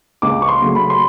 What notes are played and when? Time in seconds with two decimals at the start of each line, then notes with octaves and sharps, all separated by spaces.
0.22 C#2 D6
0.42 C#6
0.49 C6
0.62 C#3 F#3 A3
0.75 B5
0.90 C6